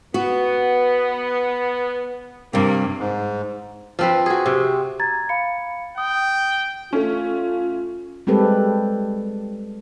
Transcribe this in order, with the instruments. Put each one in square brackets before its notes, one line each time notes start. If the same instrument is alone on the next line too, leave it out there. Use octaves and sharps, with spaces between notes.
[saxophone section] B3 [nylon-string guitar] F#4
[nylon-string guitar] G2 C3 [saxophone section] G3 A#3
[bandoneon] G#2
[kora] F3 C4 B4
F#4 G#4
C3
[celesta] A#5 G#6 A6
F5 B5 C#7
[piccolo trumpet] G5 [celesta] D#6
[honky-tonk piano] A3 C#4 [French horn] F4
[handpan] G3 G#3 C4 G4 A4 B4